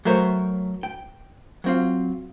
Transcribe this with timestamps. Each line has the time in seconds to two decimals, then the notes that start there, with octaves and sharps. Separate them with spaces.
0.05 F#3 A3 A#4 C5 C#5
0.83 G5
1.64 F#3 C4 F4